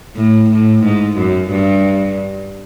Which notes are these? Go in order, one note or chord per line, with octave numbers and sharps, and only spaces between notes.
A2
A2
G#2
F#2
G2